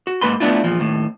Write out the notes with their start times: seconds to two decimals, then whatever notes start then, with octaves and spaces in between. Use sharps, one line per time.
0.07 F#4
0.21 G#2 A#3 B4 B5 C6
0.40 A3 B3 C4 D4 E4 F4
0.64 E2 A#2 F3
0.79 D#2 A2